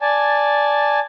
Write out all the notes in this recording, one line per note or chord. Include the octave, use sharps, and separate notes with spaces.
D5 G#5 A5